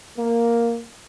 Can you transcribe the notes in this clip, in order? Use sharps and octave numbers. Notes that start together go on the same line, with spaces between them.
A#3